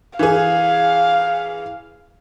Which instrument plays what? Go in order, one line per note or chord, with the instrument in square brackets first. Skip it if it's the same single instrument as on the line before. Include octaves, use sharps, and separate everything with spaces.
[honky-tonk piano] E3 G#4 [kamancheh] F5